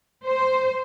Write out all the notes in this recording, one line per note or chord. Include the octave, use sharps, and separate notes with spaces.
C5